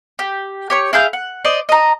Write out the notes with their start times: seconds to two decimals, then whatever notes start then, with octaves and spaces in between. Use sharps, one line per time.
0.19 G4
0.70 G4 C#5 C#6
0.93 E4 G#4 F5 G6
1.13 F#5
1.44 C5 D5 D#5
1.69 D#5 A#5